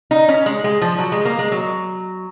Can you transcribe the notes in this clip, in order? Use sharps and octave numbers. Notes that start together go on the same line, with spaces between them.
D#4
C#4
G#3
G#3
F3
F#3
G#3
A#3
G#3
F#3